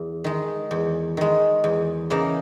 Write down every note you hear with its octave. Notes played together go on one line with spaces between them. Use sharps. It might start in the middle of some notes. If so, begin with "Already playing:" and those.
Already playing: E2
D#3 G#3
E2
D#3 G#3
E2
C#3 E3 A#3 D#4